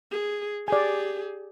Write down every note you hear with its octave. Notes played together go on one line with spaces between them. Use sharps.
G#4
G4 G#4 D5 G#5